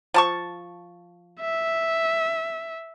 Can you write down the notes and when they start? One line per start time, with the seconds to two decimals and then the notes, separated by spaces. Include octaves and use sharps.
0.14 F3 A5 C#6
1.40 E5